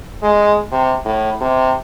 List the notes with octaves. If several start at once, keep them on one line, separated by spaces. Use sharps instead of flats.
G#3
C3
A2
C3